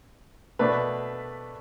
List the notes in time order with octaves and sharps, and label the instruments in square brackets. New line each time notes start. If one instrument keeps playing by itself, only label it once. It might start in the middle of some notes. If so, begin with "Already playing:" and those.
[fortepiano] B2 A3 D4 B4